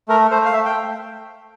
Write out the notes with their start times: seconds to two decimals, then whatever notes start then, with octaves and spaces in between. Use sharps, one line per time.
0.08 A3 A#4
0.31 A3 C5
0.45 F5
0.53 A3 E5
0.65 G5